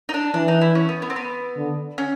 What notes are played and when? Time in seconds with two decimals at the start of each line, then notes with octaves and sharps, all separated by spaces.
0.09 D#4
0.14 D4
0.34 E3 D4
0.48 D#4
0.61 E4
0.75 C#4
0.89 B3
1.02 B3
1.10 C4
1.16 B3
1.57 D3
1.98 C#4